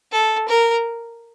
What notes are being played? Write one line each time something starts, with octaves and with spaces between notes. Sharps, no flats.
A4
A#4